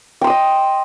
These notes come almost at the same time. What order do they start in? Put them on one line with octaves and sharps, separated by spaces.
G5 C6 D#6 D#5